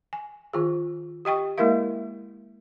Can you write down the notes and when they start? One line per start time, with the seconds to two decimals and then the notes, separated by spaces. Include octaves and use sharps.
0.13 G#5
0.53 D#3 F4 G#4
1.25 G4 D#5 G5 C#6
1.58 G#3 A#3 E4 A#4 E5 F5